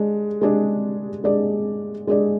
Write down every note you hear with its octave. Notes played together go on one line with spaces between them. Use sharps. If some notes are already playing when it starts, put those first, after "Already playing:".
Already playing: G#3 D4
G#3 D4 G#4 D5
G#3 D4 G#4 D5
G#3 D4 G#4 D5